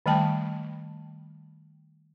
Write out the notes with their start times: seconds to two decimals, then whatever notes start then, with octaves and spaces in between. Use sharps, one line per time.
0.06 D#3 G3 A3 G5 A5